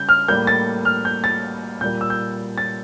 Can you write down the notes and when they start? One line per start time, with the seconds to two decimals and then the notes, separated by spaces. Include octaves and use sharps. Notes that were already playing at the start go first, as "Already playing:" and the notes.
Already playing: C#3 G3 G6
0.09 F6
0.28 A2 G3 A#3 G6
0.47 A6
0.85 F6
1.05 G6
1.24 A6
1.81 A#2 G3 A#3 G6
2.01 E6
2.10 G6
2.58 A6